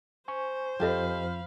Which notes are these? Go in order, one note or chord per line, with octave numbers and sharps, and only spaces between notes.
C5 G#5 C#6
F2 F3 G4 A4 D#5 F5 B5